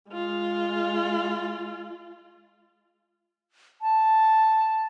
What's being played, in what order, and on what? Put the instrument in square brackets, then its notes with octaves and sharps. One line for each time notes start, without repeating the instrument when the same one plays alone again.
[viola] G#3 F4
[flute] A5